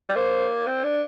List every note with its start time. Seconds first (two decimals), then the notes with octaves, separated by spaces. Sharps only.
0.09 G3
0.16 A#3 C5
0.67 C4
0.84 D4